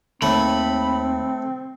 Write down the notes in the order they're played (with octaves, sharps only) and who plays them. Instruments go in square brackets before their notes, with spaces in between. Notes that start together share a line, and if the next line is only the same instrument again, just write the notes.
[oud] D#2 [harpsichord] A3 [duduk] C4 [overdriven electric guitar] B5